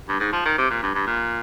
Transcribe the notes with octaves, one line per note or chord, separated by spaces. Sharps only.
G2
G#2
F3
D#3
C3
A#2
G2
G2
A#2